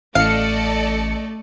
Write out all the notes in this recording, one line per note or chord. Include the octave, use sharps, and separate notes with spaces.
A1 A3 A4 D5 D#5 F5 C#7